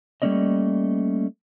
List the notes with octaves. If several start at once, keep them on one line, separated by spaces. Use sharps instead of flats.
G3 A3 A#3 C#4 D5 D#5